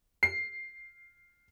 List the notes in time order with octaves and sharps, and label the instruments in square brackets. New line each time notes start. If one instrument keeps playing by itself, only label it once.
[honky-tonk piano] C7